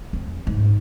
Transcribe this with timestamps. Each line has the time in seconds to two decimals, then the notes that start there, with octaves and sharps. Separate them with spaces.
0.13 F2
0.47 G#2